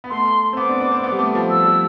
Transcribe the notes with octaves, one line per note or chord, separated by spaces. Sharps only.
B3
A3 C6
C4
B3 D6
D4
D4
C4
B3
G3
A3
F3
G3 E6
G3